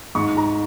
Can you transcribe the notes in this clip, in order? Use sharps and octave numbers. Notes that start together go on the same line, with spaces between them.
G#2 C#6
A#5